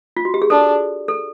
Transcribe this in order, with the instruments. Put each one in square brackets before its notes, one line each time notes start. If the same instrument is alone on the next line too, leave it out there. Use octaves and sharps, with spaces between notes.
[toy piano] F4
F#4
G4
G#4
[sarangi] D4 [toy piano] A4
[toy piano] A4